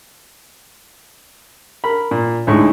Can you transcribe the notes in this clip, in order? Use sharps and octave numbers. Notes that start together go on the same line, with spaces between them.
A#4 B5
A#2
D2 A2 G#3 D#4 C#6